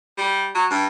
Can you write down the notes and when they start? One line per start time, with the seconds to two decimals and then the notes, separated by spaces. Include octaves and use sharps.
0.18 G3
0.55 F#3
0.70 G2